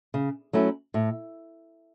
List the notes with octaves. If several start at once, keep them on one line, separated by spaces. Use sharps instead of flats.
C#3
F#3 A3 C#4 E4
A2